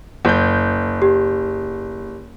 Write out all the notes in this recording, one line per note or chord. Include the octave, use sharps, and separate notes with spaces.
F#1 G6
G4